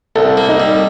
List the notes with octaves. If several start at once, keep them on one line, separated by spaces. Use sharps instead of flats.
C2 A4
A#3
D#4
G3